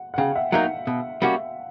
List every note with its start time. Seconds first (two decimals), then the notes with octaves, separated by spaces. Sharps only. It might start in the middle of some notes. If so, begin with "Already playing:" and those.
Already playing: F#5
0.14 F#5
0.18 C#3 F5 G5
0.35 E5 F#5
0.52 F#3 A#3 D#4 E5 F#5
0.87 B2
1.22 G3 A#3 C#4 F#4